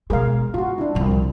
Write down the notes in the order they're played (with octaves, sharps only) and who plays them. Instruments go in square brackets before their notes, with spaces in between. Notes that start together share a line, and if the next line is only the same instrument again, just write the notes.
[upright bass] B2 G#3 [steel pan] G#4 A#4 F5
[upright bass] G#2 [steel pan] F4 F#4
[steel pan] D4 E4
[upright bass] C2 F3